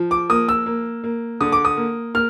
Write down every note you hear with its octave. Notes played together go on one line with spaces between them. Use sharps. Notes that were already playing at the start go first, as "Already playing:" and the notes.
Already playing: F3
D6
A#3 D#6
E6
A#3
A#3
D3 D#6
D6
D#6
A#3
A#3 F6